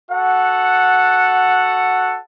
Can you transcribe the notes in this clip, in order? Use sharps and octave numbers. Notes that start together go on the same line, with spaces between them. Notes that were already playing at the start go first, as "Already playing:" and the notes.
F#4 A4 F#5